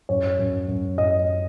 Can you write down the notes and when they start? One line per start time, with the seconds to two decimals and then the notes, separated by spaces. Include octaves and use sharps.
0.09 F#2 C#5
0.39 F#2
0.68 F#2
0.98 F#2 D#5